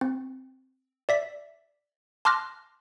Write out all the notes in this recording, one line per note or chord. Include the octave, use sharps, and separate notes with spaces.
C4
D5 E5 B6
A5 C6 D6 F6 F#6 A#6